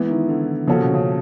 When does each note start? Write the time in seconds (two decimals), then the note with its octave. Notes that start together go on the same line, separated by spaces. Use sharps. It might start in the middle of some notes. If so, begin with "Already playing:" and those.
Already playing: E3 G#3 B3 E4
0.09 D#3
0.29 D3
0.67 C#3 F3 A#3 C#4 F#4 A4
0.81 B2
0.94 C#3